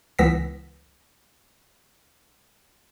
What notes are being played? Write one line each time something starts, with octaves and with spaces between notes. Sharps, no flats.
C#2 E3 B3 E6 A#6 B6